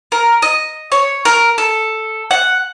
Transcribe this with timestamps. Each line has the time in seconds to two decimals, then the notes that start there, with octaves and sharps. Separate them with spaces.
0.12 A#4
0.42 D#5
0.92 C#5
1.25 A#4
1.58 A4
2.31 F#5